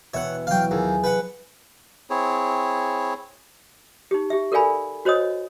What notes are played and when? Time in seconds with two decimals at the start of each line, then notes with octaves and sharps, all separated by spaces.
0.14 E1 B3 C#5 E5 F#5
0.47 E3 F#3 F5 G5
0.71 D#2 F4 G#4 A4
1.04 B4 F#5
2.10 C4 E4 G#4 C#5
4.11 D#4 G4
4.30 G4 E5
4.52 A4 A#4 D5 F5 G#5 B5
5.05 F#4 C5 C#5 D#5 D#6